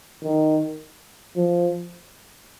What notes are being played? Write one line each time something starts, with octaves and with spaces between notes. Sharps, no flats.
D#3
F3